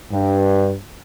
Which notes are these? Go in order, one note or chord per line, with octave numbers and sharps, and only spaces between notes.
G2